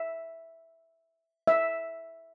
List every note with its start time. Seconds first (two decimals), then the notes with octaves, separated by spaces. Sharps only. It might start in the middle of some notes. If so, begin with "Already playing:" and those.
Already playing: E5
1.47 E5